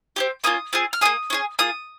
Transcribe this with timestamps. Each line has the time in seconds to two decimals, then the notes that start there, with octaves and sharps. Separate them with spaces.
0.16 C4 D#4 G4
0.44 A#3 C#4 F4 D#6
0.73 C4 F4 G#4
0.93 F6
1.01 A#3 F4 G#4 D#6
1.30 C#4 F4 G#4
1.59 A#3 F4 G#4 D#6